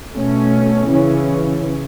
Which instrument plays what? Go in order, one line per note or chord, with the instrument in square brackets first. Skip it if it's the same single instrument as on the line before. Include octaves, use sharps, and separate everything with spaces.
[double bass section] B2 A3 C#4
C#3 E3 C#4